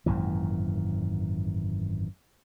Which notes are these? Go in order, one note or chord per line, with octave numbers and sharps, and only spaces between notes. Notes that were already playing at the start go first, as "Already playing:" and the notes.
G#1 F#2 A#2 E3